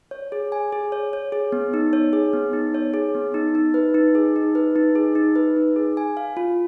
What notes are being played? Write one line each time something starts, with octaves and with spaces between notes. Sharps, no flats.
C#5
G#4
G#5
G#4
C#5
C#5
G#4
B3
D#4
C#5
G#4
B3
D#4
C#5
G#4
B3
D#4
D#4
B4
D#4
G#4
D#4
B4
D#4
G#4
D#4
B4
D#4
G#4
G#5
F5
F4